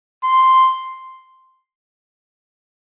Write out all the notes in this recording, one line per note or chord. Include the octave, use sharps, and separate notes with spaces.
C6